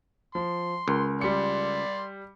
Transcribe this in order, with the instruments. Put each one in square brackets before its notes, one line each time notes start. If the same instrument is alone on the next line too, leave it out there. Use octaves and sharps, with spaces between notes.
[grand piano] F3 [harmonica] C6
[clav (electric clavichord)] C#2 [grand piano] A#4
[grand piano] G3 C#7 [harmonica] D5 C6